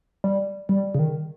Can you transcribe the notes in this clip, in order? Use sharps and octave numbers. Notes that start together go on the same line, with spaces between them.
G3
G3
C#3
D#3